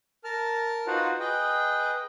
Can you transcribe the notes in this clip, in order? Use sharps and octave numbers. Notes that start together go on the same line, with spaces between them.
A#4 A5 F6
D#4 F4 F#4 B4 C5 F#5
G#4 B4 D#5 G5